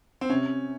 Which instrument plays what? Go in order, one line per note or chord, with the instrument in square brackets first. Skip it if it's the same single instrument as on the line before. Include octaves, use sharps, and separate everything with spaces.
[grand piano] C4
[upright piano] C3 [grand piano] C#4